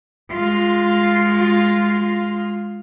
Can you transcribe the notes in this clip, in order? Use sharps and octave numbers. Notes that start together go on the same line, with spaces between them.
G#3 F4